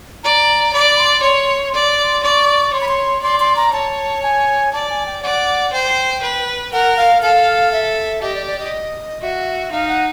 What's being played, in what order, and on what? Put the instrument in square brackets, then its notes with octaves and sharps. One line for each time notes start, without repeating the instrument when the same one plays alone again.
[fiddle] D5 [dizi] A#5
[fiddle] D5 [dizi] B5
[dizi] C6
[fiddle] C#5 [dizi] C6
[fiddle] D5 [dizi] C6
[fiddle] D5 [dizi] C#6
[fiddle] C#5 [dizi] C6
[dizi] B5
C6
[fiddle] D5 [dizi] C6
[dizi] C6
A#5
[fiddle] C#5 [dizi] A5
[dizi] G#5
[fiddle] D5 [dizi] A5
[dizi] G#5
G5
[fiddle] D5 [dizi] F#5
[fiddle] C5 [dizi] G5
[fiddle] B4
[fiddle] A#4 [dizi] F#5
[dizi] F5
[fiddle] A4 [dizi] F5
[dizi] E5
[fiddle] G4 [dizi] D#5
[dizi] D5
D5
D#5
[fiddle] F#4 [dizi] E5
[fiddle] D#4 [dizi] F5
[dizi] F#5